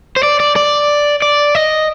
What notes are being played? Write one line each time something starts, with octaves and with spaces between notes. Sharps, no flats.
C5
D5
D5
D5
D5
D#5